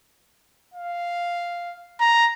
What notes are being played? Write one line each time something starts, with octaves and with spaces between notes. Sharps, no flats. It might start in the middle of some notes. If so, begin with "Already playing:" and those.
F5
A#5